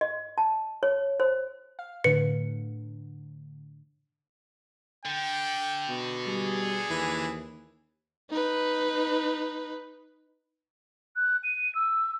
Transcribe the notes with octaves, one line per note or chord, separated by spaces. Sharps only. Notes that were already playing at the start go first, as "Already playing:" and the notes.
D#5
A5
C#5
C5
F5
A2 D3 B4 C#7
D3 G5
B2
G3 G#4
D#2 E3
D#4 B4
F#6
D#7
E6